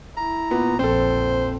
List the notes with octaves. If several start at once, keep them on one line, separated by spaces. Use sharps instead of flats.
E4 A#5
A#2 B3
A#1 F2 C4 A4 C5